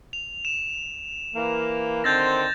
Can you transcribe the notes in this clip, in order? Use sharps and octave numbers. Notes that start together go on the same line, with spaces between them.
F7
E7
E3 A#3
D3 D#3 C4 G6 A6 A#6